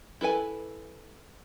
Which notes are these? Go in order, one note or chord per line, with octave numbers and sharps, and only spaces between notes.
E4 A4 B4 G#5